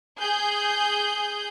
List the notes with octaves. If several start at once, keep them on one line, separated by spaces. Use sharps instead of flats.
G#4 G6